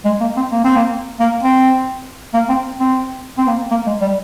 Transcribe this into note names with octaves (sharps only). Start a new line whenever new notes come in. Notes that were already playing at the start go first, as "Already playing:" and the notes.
G#3
A#3
C4
A#3
C4
A#3
A#3
C4
A#3
C4
C4
C4
A#3
A#3
G#3
G3